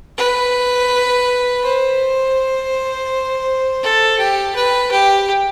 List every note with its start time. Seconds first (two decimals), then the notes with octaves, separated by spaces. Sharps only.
0.18 B4
1.63 C5
3.83 A4
4.19 G4
4.55 B4
4.92 G4